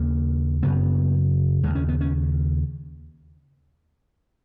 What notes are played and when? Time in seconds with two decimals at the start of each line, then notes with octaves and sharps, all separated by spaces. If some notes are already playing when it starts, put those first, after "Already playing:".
Already playing: D#2 C#3 A#3
0.63 F#2 C#3 B3
1.63 D#2 C#3 G#3
1.75 C#4
1.89 B3
2.01 C#4